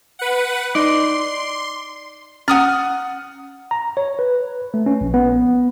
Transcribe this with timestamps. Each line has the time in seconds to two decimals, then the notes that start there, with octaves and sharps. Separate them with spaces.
0.19 B4 F#5
0.75 D#4 D5 C6
2.48 C#4 F#5 D#6 F6
3.71 A#5
3.97 C#5
4.19 B4
4.74 A3
4.86 C#4
5.01 A#1
5.14 B3